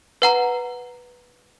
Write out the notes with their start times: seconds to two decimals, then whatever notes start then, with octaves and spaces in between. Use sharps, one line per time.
0.22 B4 F#5 A#5